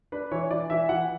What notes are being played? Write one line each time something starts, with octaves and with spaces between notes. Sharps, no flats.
D4 B4
E3 C#5
E3 D5
E3 E5
E3 F#5